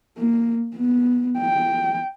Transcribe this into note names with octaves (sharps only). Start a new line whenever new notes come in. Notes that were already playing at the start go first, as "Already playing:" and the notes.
A#3
B3
G5